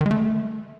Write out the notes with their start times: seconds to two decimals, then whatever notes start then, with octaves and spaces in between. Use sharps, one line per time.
0.01 D#3
0.06 G#3
0.11 A3